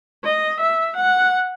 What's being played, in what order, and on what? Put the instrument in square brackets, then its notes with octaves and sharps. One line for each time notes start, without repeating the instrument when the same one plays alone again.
[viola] D#5
E5
F#5